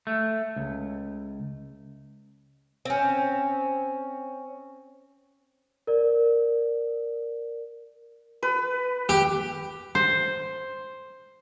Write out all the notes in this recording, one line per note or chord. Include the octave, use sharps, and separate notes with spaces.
A3
C#2
C4 C#4
A#4 D5
B4
G4
C5